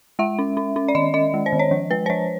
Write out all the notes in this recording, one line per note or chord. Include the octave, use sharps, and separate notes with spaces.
G#3 E5
C#4
C#4
C#4
D5
D#3 D#5
C#4 D#5
G#3
C5
D#3
C#5
F3
G#3 B4
C5
F3 C#5